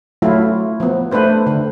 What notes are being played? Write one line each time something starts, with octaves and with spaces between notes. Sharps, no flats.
F#3 A3 E4 F4
F3 B3
A3 D4 B4 C5
D3